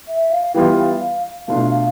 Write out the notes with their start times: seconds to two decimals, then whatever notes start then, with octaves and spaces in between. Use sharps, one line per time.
0.08 E5
0.31 F5
0.54 E3 G3 B3 F4 G5
0.78 F5
1.01 F5
1.48 B2 A3 D4 F4 F5
1.71 F5